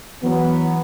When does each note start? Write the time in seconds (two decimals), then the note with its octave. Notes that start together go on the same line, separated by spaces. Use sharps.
0.23 E3 F#3 B3